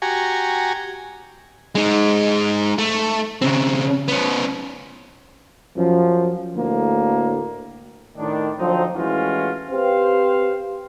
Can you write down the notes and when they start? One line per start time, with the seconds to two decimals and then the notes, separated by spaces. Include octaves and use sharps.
0.02 F#4 G4 G#5 A#5 C#6
1.75 G#3 D#4
2.78 A3
3.42 C#3 C4
4.08 B3 C#4
5.76 F#2 F3
6.56 D2 A2 A#3
8.17 A2 D#3 D4
8.59 D3 F3 F#3 C4 D#4
8.94 A2 E3 G#3 C#4 F4 F#4
9.70 C4 G4 B4 C5 F5